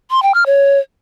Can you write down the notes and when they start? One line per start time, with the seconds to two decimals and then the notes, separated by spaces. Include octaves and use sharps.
0.11 C6
0.23 G5
0.34 F6
0.46 C#5